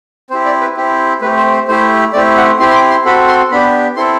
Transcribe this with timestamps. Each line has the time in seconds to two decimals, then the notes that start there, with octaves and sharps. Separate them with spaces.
0.30 C4 E4 G4 C5
0.45 D5
0.61 B4
0.77 C4 E4 G4
1.22 A3 C4 G4 B4
1.37 C5
1.52 C5
1.68 A3 E4 G4 C5
2.13 A3 C4 E4 G4 D5
2.37 F#5
2.59 C4 E4 G4 C6
2.70 C6
2.75 D6
2.90 C6
3.05 C4 F#4 A4 B5
3.27 C6
3.52 B3 D4 G4 B5
3.96 C4 E4 A4 C6